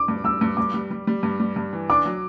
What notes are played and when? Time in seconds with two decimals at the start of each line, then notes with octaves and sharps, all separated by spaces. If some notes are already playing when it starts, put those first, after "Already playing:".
Already playing: D6
0.08 G2
0.24 G2 E6
0.41 G2
0.57 G2 D6
0.74 G3
0.91 G3
1.07 G3
1.23 G2
1.40 G3
1.56 G2
1.73 E3
1.90 D4 D6
2.05 F#3